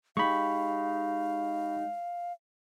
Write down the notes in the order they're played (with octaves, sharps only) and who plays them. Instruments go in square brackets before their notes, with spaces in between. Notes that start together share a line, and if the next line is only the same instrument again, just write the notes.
[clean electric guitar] G#3 D#4 G4 [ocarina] F5 [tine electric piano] B5 C#6